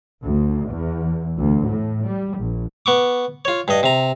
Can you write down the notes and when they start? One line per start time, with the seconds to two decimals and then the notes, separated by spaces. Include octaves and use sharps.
0.23 D2
0.69 E2
1.38 D2
1.66 A2
2.05 G3
2.38 A#1
2.86 B3 C#6 D6
3.45 F4 C#5
3.68 G2 D#5
3.83 C3 A#5